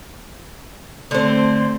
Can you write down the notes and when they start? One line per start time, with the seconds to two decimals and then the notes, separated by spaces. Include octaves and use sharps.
1.11 D3 A3 C4 C5